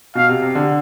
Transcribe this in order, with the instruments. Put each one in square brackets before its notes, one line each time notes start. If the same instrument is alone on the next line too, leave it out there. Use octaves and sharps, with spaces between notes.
[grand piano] B2 [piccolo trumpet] F5
[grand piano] C3
C3
D3